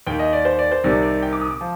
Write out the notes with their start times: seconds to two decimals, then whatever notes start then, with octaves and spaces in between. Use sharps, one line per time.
0.07 D#2 D#3 G5
0.19 D#5
0.33 D5
0.45 C5
0.59 D5
0.72 C5
0.84 C2 C3 D#3 D5
1.03 D5
1.22 G5
1.33 D6
1.41 D#6
1.51 D6
1.61 F3